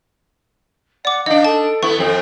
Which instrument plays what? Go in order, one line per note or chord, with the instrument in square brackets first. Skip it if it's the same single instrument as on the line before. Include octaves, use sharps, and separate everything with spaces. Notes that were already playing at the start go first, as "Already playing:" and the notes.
[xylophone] D5 D6 [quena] F#5
[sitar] D4 D#4 [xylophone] D#5 [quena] F5
[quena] A4 [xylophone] A5
[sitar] B3 E4 [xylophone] C#6
[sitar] F2 C4